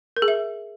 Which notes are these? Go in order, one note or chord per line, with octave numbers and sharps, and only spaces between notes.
A#4
G#4
E5